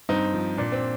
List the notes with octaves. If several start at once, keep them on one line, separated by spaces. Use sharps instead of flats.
G2 C4 D#4
F3
A#2 D4
C4